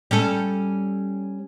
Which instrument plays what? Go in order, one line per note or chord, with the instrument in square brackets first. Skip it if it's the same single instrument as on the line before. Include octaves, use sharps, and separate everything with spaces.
[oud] G3 C#4 A4